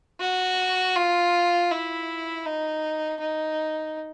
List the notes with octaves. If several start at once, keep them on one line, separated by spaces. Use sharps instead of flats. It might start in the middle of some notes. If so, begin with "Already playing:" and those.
F#4
F4
E4
D#4
D#4